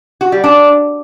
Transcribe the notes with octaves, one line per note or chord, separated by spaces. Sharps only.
F#4
G3
D4